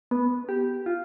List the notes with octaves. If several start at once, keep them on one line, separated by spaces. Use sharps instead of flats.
B3
G4
F4